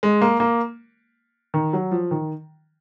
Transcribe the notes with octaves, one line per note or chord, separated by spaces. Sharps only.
G#3
A#3
A#3
D#3
F#3
F3
D#3